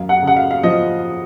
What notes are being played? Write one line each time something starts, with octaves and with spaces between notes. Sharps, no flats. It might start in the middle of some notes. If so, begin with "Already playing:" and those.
Already playing: F#2 F5
F#5
C#3
F#5
F5
F5
F3 D#5